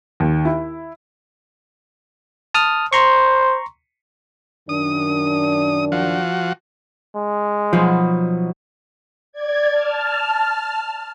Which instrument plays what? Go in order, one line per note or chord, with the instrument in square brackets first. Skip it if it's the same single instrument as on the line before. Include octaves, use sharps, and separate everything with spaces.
[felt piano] D#2
E4
[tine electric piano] A5 D#6 F6
[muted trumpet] C5 [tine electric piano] A#5 C6 C#6
[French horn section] F#2 D#3 D4 [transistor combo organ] D#6
[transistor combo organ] F3 F#4
[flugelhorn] G#3
[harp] B2 F#3 D#4 [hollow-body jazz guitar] F3
[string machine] D5 G#6
A5 F6